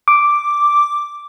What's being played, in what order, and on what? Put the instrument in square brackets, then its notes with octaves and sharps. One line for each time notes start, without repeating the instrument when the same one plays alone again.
[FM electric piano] D6